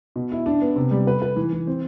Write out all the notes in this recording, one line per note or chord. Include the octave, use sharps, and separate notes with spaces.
B2
E4
D4
B3
C3
G3
B4
B4
E3
E3
C4